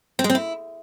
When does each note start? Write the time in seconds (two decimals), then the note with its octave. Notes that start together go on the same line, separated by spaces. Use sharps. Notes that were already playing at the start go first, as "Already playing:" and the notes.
0.19 C4
0.24 G#3
0.30 C4
0.35 E4